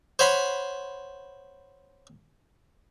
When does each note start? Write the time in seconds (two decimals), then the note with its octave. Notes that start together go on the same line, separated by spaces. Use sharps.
0.19 C5 C#5 F#5 B5 C6